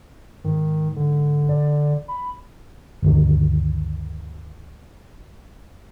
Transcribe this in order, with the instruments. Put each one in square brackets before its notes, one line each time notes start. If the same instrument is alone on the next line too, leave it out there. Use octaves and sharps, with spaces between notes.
[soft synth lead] G#2 [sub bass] D#3
[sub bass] D3
[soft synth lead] D5
B5
[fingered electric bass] G1 D2 D#3